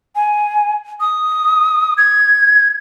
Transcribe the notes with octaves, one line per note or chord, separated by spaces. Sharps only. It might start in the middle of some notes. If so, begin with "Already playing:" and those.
G#5
D#6
G#6